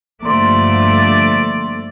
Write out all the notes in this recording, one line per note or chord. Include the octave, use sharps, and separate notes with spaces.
G2 D3 F3 A3 A#3 D5 C6